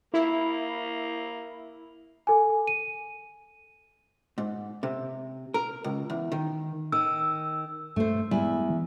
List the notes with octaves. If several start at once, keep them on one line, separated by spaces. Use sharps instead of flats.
A#3 E4
A4 G#5
D#7
G#2
C3
A#4
C#2
E2
D#3
D#3 E6
G2 A3 C5
E2 G3 G#3 E4
E3